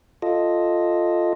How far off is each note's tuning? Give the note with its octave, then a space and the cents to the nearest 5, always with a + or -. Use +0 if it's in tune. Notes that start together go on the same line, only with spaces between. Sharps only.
F4 +0 A4 +0 D#5 +0